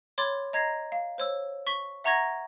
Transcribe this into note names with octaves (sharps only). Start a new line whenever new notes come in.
C#5 B5 C6 D6 G#6 A6
D#5 A#5 G#6 A#6 C7
F5
C5 C#5 E6
C#6 B6 G7
E5 F#5 A#5 C#6 G#6 A#6